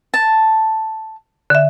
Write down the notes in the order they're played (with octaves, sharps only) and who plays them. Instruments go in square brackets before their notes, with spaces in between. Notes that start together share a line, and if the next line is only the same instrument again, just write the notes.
[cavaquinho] A5
[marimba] D3 E5